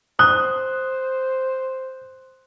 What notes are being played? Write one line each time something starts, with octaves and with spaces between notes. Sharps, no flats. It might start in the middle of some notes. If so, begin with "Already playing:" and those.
C5 D#6 F#6